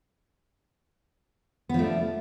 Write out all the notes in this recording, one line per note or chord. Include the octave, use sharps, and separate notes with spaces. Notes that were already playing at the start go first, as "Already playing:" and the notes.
F3 A3 B3 D4